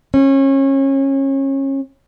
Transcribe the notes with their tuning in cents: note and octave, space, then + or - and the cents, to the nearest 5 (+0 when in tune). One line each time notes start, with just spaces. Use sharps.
C#4 -30